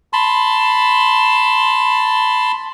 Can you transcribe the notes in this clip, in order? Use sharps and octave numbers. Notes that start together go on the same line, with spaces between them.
A5 B5 C6